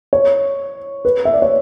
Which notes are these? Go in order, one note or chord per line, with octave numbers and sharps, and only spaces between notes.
C#5
B4
E5
D5
C#5